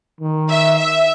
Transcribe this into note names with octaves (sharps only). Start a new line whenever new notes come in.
D#3
E5
E5